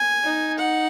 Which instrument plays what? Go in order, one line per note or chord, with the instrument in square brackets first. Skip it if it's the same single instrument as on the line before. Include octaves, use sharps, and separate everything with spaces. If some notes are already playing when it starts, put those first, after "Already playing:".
Already playing: [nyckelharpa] G#5
[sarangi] D#4
[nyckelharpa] F#5